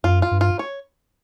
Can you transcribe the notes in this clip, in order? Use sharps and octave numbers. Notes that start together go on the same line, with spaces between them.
F#2 F4
F4
G2
F4
C#5